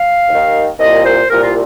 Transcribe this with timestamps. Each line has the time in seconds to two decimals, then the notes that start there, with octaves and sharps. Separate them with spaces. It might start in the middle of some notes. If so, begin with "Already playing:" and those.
Already playing: F5
0.29 D#2 D#3
0.79 C2 A#2 D#5
1.05 C5
1.30 C2 A#2 A#4
1.43 F4